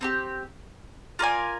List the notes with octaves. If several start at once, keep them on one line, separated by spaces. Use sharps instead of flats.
C4 D#4 G4
F4 A#4 D5 G#5